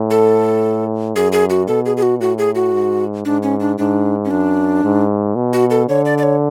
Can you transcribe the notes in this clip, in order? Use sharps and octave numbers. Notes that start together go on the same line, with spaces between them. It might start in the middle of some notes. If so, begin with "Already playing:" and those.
Already playing: A2
A4
F#2 G#4
G#4
F#4
B2 A4
G#4
G#4
F#4
A2 F#4
G#4
F#4
G#2
G#2 D4
C#4
D4
G#2 D4
C#4
F#2 D4
G#2
B2
F#4
A4
D3 C#5
D5
D5
C#5